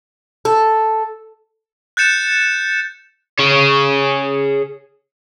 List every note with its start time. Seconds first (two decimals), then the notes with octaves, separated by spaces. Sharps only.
0.45 A4
1.97 F#6 G6 A6 C#7 E7
3.39 G#4 C#5